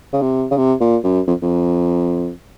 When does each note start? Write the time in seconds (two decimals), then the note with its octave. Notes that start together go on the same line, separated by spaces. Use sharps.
0.13 C#3
0.22 C3
0.51 C#3
0.57 C3
0.80 A#2
1.04 F#2
1.27 F2
1.42 F2